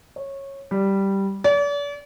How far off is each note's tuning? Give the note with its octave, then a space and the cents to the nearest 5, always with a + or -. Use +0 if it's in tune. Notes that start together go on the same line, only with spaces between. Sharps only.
C#5 -15
G3 -5
D5 -40